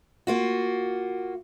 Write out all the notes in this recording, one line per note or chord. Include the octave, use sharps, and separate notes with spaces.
A#3 F4 F#4